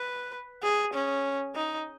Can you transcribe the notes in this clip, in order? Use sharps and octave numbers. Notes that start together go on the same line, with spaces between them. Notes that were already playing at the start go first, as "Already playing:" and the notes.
Already playing: B4
G#4
C#4
D#4